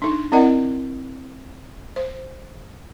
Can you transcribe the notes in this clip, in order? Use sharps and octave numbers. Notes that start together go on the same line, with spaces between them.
D4 D#4
C4 E4 A#4 D5 D#5 F#5
C5